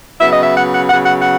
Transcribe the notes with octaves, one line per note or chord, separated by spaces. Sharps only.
C#3 F#3 B3 E5
D#5
E5
F#5
F#5
C#3 F#3 B3 F#5
F#5
F#5